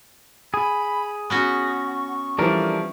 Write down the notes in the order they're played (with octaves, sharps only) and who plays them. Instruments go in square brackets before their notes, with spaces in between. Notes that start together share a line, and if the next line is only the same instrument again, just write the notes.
[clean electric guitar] G#4 [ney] B5
[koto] B3 C#4 F#4 [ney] C#6
[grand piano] E3 F3 G3 [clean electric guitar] D4 A4 A#4